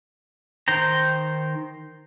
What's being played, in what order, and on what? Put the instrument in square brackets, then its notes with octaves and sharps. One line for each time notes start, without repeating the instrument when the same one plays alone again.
[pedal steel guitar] D#3 C5 G5 A#5